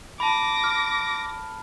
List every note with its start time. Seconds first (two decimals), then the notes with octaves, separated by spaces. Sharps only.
0.20 A5 B5 D6 A#6
0.64 F6